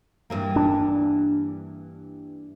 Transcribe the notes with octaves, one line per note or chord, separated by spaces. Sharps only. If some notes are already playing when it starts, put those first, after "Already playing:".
G2 E3 A#3
D4